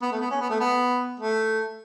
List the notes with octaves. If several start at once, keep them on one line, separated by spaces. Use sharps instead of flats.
B3
A3
B3
C#4
B3
A3
B3
A3